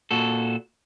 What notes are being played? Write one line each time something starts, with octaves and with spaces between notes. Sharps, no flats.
A#2 F#4 A4